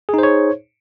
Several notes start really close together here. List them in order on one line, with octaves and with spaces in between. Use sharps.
G#4 D#4 C5 C#5